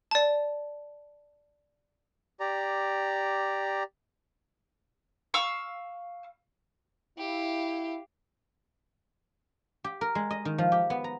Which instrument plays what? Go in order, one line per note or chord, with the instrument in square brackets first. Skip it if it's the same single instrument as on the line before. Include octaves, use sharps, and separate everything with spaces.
[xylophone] D5 A5
[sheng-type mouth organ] G4 D5 A#5
[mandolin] F5 C#6 E6
[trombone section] E4 [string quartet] G4 F5
[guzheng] G4
A#4
G#3
D#5
D#3
F3
G4
B3
A#5